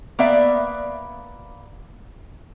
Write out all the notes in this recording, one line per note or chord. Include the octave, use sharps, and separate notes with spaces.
A#3 B3 D5 E5